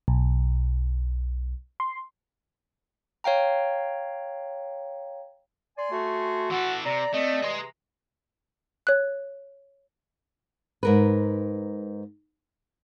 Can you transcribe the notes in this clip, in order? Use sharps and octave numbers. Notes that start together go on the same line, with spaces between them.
B1
C6
C#5 F5 G5 A#5
D5 G#5 C6
A3 F#4
E3 A4 F#5
C3 D5 A#5
A3 C4 D#5
C3 E3 G#4 A#5 C6
C#5 F#6
G#2 A#4 B4